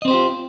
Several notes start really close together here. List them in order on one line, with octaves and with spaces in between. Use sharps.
D#5 C4 C5 G4 F4